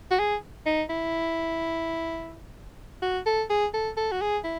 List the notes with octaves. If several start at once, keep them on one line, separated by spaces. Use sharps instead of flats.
F#4
G#4
D#4
E4
F#4
A4
G#4
A4
A4
F#4
G#4
E4